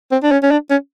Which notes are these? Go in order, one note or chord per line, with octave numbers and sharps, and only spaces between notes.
C4
D4
C#4
C#4
D4
C#4